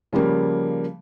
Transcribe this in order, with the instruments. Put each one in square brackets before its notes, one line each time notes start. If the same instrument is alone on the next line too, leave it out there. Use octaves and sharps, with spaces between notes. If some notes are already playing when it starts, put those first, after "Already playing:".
[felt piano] C#3 F3 G3 A#3